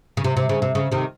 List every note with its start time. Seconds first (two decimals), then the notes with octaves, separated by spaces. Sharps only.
0.17 C#3
0.24 C3
0.37 C3
0.49 C#3
0.62 C3
0.75 C#3
0.92 C3 D#3